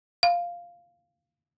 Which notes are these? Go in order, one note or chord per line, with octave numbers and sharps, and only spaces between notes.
F5